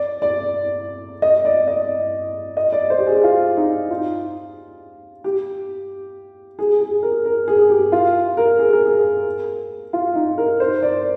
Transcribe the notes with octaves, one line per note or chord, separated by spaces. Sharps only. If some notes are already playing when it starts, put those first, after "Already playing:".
Already playing: D5
D5
D#5
D5
D#5
D#5
D5
C5
G4
G#4
F4
D#4
F4
G4
G#4
G#4
A#4
A#4
G#4
G4
F4
A#4
G#4
A#4
G#4
F4
D#4
A#4
C5
D5